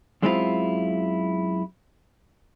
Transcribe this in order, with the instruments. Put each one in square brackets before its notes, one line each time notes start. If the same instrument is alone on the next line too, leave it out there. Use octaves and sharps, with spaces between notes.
[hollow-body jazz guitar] F#2 G#3 C4 D4 E4 F4